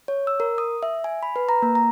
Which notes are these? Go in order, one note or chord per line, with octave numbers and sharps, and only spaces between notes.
C#5
E6
A#4
D#6
E5
G#5
B5
B4
A#5
A#3
A#5